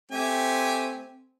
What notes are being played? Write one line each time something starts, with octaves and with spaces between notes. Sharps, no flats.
A3 C4 G4 G#5